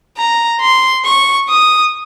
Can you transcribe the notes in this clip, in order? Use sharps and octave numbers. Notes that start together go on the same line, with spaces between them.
A#5
C6
C#6
D#6